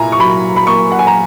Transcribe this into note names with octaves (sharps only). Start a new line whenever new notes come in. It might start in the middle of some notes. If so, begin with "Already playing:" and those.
Already playing: A#2 E4 G#5 A#5
C#6
F#3 B5
B5
A#3 C#6
F#5
G#5
A#5